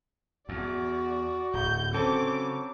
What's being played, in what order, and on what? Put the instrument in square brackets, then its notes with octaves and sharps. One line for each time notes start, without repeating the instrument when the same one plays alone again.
[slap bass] E2 [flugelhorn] F#4 [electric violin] D5
[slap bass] D1 [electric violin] G6
[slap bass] C#3 [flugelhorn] F#3 [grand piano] C4 A4 A5 [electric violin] D6